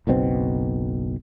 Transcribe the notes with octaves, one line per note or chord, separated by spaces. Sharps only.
F#1 B1 B2 C4